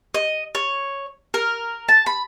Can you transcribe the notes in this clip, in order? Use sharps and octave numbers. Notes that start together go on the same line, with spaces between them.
D#5
C#5
A#4
A5
B5